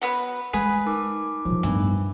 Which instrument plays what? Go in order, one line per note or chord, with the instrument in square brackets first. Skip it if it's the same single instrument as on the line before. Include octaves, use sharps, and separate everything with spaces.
[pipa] F#3 B3 B4
[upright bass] G#3 [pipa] G#4 B4
[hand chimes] D#4 A#4 D6
[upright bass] C3 F#3 [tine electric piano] F3
[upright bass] D1 B3 [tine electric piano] G2 [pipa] E3